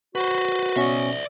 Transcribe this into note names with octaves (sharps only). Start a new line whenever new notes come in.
F#4 B4 C5
B2 C#4 D5 E5 C#6